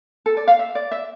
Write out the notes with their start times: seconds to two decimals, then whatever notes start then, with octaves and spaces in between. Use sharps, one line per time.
0.26 A4
0.37 D5
0.47 F5
0.59 E5
0.75 D5
0.91 E5